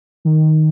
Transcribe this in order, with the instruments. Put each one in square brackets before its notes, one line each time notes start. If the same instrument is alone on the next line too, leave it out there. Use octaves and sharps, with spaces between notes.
[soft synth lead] D#3